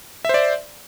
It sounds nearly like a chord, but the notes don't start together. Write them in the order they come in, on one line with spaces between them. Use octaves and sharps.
E5 C5 D5